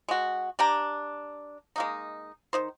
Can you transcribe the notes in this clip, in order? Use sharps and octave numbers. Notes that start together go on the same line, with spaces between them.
G#3 F#4
D4 G4 G5 A#5
G#3 A#3 D#4
D#3 D#4 C5